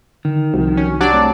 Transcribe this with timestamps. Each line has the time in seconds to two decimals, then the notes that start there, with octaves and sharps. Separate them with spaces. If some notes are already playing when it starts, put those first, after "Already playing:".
0.25 D3 D#3
0.54 C2 F3 F#4
0.77 C#4
1.01 F#3 D4 G4 C#5 D5
1.14 A3 C4